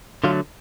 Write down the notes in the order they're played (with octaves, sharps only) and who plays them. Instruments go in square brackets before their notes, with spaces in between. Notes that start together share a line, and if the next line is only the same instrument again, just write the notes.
[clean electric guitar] D3 F#3 A3 F4